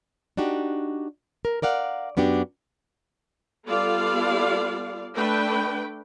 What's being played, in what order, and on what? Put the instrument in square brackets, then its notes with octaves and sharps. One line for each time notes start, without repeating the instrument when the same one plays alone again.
[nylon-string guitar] D4 D#4 F#4 G4
A#4
A#4 D5 F5 F#5
F#2 B3 D4 F#4 G4
[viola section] G3 B3 F4 A4 D5 F5
A3 D4 B4 G5